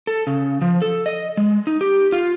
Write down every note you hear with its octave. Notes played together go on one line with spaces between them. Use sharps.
A4
C#3
F3
A4
D#5
G#3
D#4
G4
F4